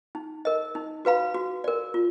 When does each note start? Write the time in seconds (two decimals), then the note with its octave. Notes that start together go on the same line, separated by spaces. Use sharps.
0.15 D#4
0.45 A#4 D#5
0.75 D#4
1.05 F#4 B4 F5 B5
1.35 F#4
1.64 A#4 D5
1.94 F4